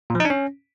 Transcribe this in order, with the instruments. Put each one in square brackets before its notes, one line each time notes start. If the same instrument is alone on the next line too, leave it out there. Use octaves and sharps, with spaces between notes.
[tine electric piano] A#2
F3
D#4
D4
C#4